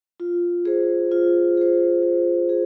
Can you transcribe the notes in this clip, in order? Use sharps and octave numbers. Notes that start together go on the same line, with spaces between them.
F4
G#4 C5
F4
G#4 C5
F4
G#4